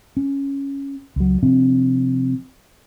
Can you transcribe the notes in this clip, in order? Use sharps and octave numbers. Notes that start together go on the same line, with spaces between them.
C#4
C#2 F#3
C3 F3 C4 D4